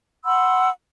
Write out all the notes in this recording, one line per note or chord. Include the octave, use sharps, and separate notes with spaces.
F#5 B5 C6 E6